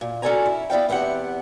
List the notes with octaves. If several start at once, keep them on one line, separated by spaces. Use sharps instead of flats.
A#2
C#4 F#4 A4 D5 G#5 A#5
E4
B3 E4 D5 F5 G5
E2 B3 C4 G4 F#5